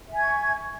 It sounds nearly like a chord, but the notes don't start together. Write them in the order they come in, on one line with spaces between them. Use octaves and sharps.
E5 G#5 G#6 C#6